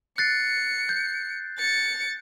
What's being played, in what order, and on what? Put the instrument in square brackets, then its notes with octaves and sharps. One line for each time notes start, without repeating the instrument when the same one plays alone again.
[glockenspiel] F#6 A6 C7 [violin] C#7
[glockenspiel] G6
[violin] A6 C#7